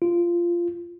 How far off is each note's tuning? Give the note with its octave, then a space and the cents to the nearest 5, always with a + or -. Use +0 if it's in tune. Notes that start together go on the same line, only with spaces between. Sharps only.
F4 -15